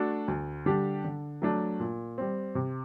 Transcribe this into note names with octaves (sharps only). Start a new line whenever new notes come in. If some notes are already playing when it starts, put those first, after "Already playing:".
Already playing: A3 D4 F#4 A4
D2
D3 G3 D4 G4
D3
F#3 A3 D4
A#2
G3 C4
C3